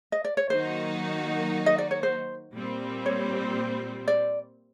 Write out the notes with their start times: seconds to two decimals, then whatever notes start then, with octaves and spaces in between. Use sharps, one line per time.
0.12 D#5
0.25 D5
0.37 C#5
0.50 D#3 F#3 A#3 D#4 F#4 C5
1.66 D#5
1.78 D5
1.91 C#5
2.03 C5
2.54 A#2 G3 C4
3.06 C#5
4.08 D5